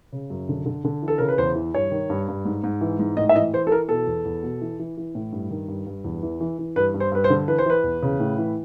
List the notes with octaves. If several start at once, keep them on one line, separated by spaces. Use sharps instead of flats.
C#3
F#2
D3
D3
D3
E3
A4
C#3 A#4
B4
E2 C5
E3
G2 C#5
D#3
G2
G2
G#2
G#2
E3
G#2
A2 D#5
E5
E3 D#5
E3 C5
A4
E3 A#4
B2 A4
E2
E2
B2
E3
E3
E3
A2
G2
D#3
G2
G2
E2
E3
E3
E3
G2 B4
G2
C5
G2 B4
C5
D3
E3 B4
C5
E3 B4
E2
C#3
A2
E3